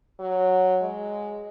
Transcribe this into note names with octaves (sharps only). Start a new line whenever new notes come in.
F#3
G#3